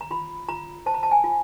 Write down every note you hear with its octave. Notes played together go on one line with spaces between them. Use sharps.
A#5
F4 B5
F4 A#5
C5 A5
A#5
A5
G#5
F4